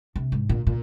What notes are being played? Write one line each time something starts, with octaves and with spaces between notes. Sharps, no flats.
C3
G#2
A#2
A#2